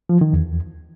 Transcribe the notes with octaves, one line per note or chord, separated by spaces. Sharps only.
F3
D#3
E2